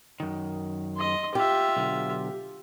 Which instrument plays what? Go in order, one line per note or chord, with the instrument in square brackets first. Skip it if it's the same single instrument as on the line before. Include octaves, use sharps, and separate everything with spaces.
[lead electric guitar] F#2 D#3
[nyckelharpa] D#5 C6
[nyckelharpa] F4 E5 [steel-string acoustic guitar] G4
[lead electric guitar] B1 D3